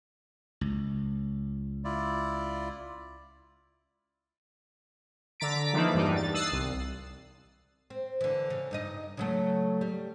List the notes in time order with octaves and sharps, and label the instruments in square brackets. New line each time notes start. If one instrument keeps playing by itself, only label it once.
[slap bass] C#2
[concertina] E4 F4 D5
[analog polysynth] D3 A#5 A6 B6 D7
E3 F3 A3 A#3 D4 D#4
E2 G2 G3 D4 D#4
A6
D#6 E6 F#6 A6 C7
C2
[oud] C4
D3 E3
C#3
G2 D#4 D#5
C#3 F#3 A3
G3